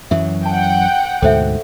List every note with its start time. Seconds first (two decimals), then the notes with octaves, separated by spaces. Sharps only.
0.11 F#2 E3 F#3 E5
0.46 F#5 G5 A5
1.22 D2 G#2 B2 A4 C5 E5